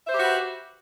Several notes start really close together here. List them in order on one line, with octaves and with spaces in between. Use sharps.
E5 C5 G4 F#4 B4